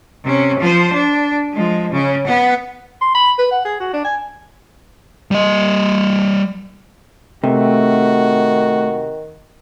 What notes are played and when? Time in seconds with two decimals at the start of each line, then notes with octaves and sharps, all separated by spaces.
0.24 C3 C#4
0.59 F3 C5
0.93 D4
1.53 F3 G#3
1.92 C#3 C#4
2.27 B3 F#5
3.01 C6
3.15 B5
3.38 B4
3.51 F#5
3.65 G#4
3.80 F#4
3.93 D4
4.04 G#5
5.31 G3 D#5
7.44 C3 D#3 A3 F#4